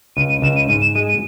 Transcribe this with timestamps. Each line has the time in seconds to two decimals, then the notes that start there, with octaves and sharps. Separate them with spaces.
0.17 C#2 D#7
0.29 D#7
0.42 C#2 E7
0.56 D#7
0.69 G#2 D#7
0.82 E7
0.95 G#3 D#7
1.08 D#7